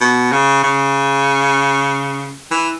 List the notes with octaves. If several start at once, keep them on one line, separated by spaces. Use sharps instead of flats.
B2
C#3
C#3
E3